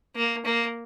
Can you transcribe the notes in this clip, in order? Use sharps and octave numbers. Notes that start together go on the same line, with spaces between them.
A#3
A#3